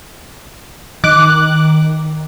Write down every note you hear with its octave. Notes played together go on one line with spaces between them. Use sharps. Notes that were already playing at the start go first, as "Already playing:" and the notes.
D#3 D6 F#6